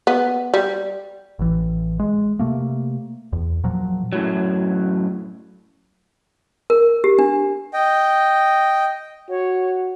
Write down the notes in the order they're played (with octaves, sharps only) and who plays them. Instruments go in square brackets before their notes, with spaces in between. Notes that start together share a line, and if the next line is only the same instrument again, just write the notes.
[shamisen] B3
G3
[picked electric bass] A1 E3
G#3
C3 A3 A#3
E2
A#2 F3 F#3
[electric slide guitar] F#2 A2 F#3
[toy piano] A#4
G4
D4
[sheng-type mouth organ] D#5 G5
[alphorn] F#4 [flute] C#5